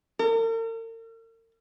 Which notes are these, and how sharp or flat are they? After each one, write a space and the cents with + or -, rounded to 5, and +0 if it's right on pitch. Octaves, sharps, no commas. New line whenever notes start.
A#4 -45